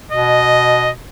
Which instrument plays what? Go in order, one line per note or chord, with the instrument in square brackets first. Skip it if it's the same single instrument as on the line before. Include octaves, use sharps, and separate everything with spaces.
[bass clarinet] B2 [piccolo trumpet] D#5